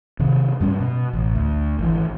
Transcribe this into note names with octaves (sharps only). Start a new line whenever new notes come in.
C3 D#3
G2 G3 C#4
B2
A1
D2
G#1 E3